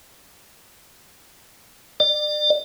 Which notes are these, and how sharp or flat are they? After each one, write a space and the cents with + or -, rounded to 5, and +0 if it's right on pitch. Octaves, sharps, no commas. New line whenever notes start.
D5 +35